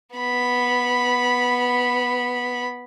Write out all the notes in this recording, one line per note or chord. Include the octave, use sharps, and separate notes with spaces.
B3 B5